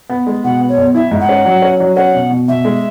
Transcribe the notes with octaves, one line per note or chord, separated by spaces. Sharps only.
B3
G#3
B2 F#5
B3
C#5
B1
E4 E5
G#2
F#5
C#4
F#3
C#4
F#3
C#4 F#5
B2
B2
B2 E5
G#3